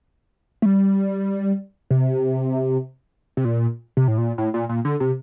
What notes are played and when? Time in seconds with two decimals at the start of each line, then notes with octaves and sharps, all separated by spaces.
0.62 A3
0.65 G3
1.91 C3
3.37 C3
3.45 A#2
3.97 C3
4.08 A2
4.18 A#2
4.38 A2
4.54 A#2
4.69 A#2
4.85 D3
5.00 C3